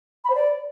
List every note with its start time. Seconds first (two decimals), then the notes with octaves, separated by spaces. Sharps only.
0.24 B5
0.30 C5
0.35 D5